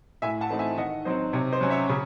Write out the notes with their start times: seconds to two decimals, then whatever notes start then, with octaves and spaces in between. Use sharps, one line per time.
0.22 A2 E5 G#5
0.41 F#5 A5
0.50 E3 A3 C4 D#4
0.59 E5 G#5
0.77 D#3 D#5 F#5
1.05 F#3 C4 D#4 C5 D#5
1.33 C3 C#5
1.52 C5 D#5
1.61 F#3 C#4
1.70 C#5 E5
1.90 C#3